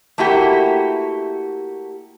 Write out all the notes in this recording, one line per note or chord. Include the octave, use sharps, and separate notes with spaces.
A3 A#3 E4 F#4 G4